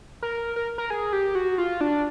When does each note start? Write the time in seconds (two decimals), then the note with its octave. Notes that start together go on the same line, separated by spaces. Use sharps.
0.23 A#4
0.56 A#4
0.78 A#4
0.90 G#4
1.13 G4
1.35 F#4
1.58 F4
1.81 D4